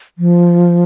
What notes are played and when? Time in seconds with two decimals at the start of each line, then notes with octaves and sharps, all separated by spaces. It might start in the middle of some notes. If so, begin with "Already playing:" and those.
0.18 F3